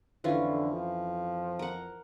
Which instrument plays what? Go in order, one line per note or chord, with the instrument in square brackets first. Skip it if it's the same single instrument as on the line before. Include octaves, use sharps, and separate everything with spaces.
[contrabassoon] F2 [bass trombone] D3 [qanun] E3 C#4 F4
[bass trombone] F3
[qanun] A#4 F#5